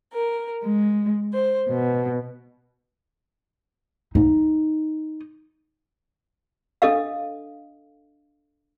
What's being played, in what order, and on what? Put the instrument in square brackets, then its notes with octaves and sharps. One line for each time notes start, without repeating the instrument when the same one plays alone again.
[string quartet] A#4
G#3
C5
B2
[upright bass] D#4
[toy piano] D4 A4 D#5 F5